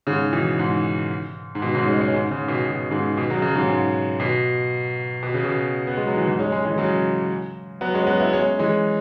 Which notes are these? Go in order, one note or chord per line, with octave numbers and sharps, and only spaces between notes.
G#2 C#3
B2 E3
G#2
G#2
B2
G#2 C#3
G#3 C#4
G#3 C#4
G#2 C#3
G#2 C#3
B2
B2
G#2 C#3
B2
C#3 F#3
C#3 F#3
G#2 C#3
G#2
B2
B2
C#3
B2
B3
G#3
F#3
E3
G#2 C#3
G#3 C#4
G#3 C#4
E3 G#3
C#3 F#3
F#3 B3
G#3 C#4
F#3 B3
B3 E4
G#3 C#4
E3 G#3